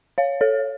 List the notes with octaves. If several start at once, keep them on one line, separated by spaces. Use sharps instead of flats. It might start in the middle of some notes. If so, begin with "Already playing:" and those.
C#5 F5
A4 C#5